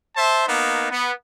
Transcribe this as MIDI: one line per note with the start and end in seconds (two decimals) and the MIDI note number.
0.16 0.47 72
0.16 0.47 76
0.16 0.47 81
0.48 0.90 58
0.48 0.90 59
0.48 0.90 63
0.91 1.12 59